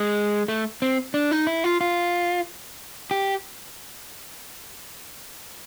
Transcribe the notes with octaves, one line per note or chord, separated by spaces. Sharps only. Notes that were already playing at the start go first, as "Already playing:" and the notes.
Already playing: G#3
A3
C4
D4
D#4
E4
F4
F4
G4